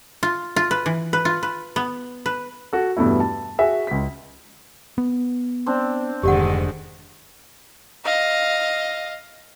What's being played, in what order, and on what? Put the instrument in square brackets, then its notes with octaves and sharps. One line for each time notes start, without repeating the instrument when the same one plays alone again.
[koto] F4
F4
B4
E3
B4
F4
B4
B3
B4
[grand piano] F#4 A4
E2 G2 B2 A3 E4
A5
F#4 G#4 E5
C#2 B6
[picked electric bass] B3
[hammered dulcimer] C4 D4
[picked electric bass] F1 [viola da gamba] G#2 D3 D#3 [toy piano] G4 D5 F#5
[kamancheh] D#5 F5